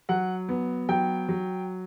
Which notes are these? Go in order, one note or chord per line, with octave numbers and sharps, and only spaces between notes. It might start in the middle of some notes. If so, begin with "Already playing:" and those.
F#3 F#5
B3
F#3 G5
F#3